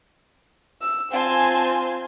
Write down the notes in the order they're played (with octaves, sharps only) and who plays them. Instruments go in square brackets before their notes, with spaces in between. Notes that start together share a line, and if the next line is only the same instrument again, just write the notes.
[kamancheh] E6
[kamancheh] C4 F4 [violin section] G#5 A5 C6